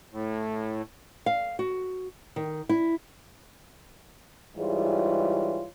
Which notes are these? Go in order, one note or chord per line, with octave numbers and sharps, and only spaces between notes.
A2
F5
F#4
D#3
E4
G#2 E3 G3 F4 G#4 C#5